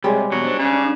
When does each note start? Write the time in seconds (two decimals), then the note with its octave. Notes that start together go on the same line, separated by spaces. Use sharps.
0.04 C3 G3 G#3 C#5
0.32 E2 B2 F#3 C4
0.44 D4 C5
0.59 C#3 C#4